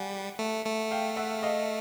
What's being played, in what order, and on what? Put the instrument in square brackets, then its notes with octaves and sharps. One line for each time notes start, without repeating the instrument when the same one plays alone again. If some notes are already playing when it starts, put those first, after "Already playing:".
Already playing: [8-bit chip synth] G3 [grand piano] F#5 G#5
[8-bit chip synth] A3
A3
[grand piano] F5 G5
E5 F#5
D#5 F5